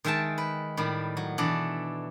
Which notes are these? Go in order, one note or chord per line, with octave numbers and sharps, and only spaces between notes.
D#3 G#3 E5 G5 A5
B4
A2 D#3 G3
F#3
B2 E3 D4 A4